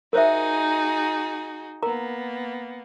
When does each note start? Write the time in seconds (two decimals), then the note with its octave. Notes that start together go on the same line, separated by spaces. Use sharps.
0.13 D#4 F#4 G#4 A#4 C5 E5
1.83 A#3 B3 A#4 A#5